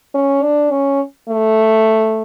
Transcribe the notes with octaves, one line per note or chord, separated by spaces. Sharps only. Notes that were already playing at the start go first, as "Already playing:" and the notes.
C#4
D4
C#4
A3